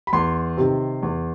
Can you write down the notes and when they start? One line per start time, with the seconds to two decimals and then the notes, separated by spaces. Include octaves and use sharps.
0.07 B5
0.13 E2 C6
0.57 C3 D#3
1.03 E2